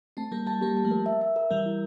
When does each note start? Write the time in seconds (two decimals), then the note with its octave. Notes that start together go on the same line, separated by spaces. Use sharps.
0.17 A3 C4 A5
0.32 G3 A#3 A#4
0.46 G3 A#3 A5
0.61 G3 A#3 G4
0.77 A5
0.85 F3 A3
0.91 A#4
1.06 E5
1.21 E5
1.36 A#4
1.50 E3 G3 A#4
1.66 E4